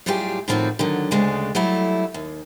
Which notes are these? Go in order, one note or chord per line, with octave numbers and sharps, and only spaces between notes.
A2 F#3 G3 F4 G4 G#4
A2 D#3 F3 C4 F4 F#4
D3 D#3 F#3
D2 C#3 G#3 A3 D4
F#3 G3 A3 E4 A4
D#2